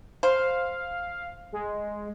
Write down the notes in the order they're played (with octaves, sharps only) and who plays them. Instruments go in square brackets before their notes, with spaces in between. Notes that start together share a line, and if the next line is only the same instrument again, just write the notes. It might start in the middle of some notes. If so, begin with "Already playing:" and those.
[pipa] C5 [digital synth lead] F5
[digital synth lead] G#3